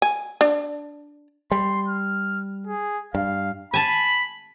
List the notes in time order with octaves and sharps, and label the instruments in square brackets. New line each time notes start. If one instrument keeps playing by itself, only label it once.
[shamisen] G#5
D4
[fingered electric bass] G3 [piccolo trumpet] C6
[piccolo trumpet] F6
G#4
[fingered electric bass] G2 [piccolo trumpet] F5
[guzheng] G#5 A5 [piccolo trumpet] B5